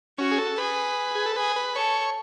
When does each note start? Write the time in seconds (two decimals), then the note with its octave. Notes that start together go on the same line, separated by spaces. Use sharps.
0.18 C#4 F#4
0.31 G#4
0.38 A4
0.57 G#4 B4
1.15 G#4
1.26 A4
1.36 G#4 B4
1.56 B4
1.74 A4 C#5